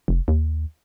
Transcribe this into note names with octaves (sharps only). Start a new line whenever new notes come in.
F1
D#2